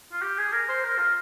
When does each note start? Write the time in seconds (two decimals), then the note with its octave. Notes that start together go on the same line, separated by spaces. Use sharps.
0.12 F4
0.22 G4
0.38 G#4
0.53 A#4
0.69 C5
0.84 A#4
0.98 F4